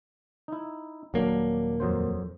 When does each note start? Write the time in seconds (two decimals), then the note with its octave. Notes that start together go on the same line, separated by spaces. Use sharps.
0.48 D#4 E4
1.14 D#1 F#3 A#3 D4
1.80 F2 F#3 C5